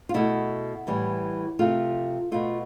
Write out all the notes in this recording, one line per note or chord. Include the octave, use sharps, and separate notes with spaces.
F4
B2 A3 E4
A2 E3 G3
C3 F3 A3 F4
B2 A3 F4